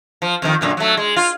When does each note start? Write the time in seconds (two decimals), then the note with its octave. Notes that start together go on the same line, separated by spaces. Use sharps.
0.22 F3
0.42 F2 C3 D#3
0.61 F#2 A#2 D3
0.77 F#3 A3
0.97 G#3
1.16 F4